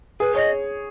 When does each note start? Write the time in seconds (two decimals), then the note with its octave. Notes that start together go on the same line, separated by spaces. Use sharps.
0.20 G#4 B4
0.36 C#5 D#5